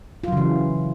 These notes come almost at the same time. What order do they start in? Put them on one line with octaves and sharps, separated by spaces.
F4 F#3 C#3 E3